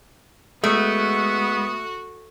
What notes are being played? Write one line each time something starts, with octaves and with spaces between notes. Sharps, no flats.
G#3 A3 B3 F#4